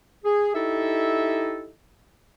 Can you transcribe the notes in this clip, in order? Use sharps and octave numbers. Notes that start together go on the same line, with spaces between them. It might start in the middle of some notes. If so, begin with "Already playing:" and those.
G#4
D#4 E4 G4 A4 D#5 E5